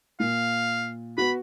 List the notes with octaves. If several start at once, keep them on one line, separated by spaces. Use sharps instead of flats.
A#2 F5
B3 F#4 B5